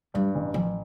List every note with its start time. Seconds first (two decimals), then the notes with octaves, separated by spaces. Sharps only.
0.14 G2 G3
0.35 A1
0.54 A1 F3